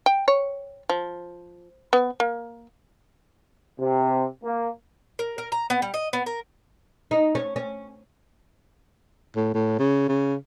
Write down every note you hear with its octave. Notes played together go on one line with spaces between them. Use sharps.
G5
C#5
F3
B3
A#3
C3
A#3
A#4
A#4
A#5
B3
G3
D#5
B3
A#4
D#4
C#4
C#4
A2
A2
C#3
C#3